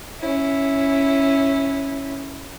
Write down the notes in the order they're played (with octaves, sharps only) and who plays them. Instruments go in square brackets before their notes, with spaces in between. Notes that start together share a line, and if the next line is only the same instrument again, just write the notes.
[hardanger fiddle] C#4 E4